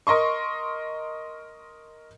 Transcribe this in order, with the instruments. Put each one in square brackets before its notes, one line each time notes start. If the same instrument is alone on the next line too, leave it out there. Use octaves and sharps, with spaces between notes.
[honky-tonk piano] A#4 D#5 C6 C#6